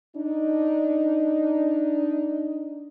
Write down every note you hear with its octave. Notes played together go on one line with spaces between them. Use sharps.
D4 D#4